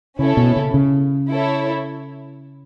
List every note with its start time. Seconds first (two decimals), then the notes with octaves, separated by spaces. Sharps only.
0.19 C#3 C#4 E4 A4 C#5
0.37 B2
0.56 C#3
0.74 C#3
1.30 E4 A4 C#5